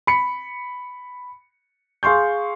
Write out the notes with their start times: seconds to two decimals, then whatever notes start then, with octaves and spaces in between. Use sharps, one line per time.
0.07 B5 C#7
2.03 G#4 F5 C6 C#6 G6